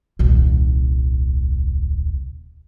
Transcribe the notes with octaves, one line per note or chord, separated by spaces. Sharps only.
D#1 C2